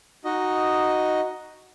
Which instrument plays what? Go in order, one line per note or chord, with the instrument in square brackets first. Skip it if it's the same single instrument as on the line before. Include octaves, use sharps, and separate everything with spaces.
[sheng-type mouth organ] D#4 F#4 D#5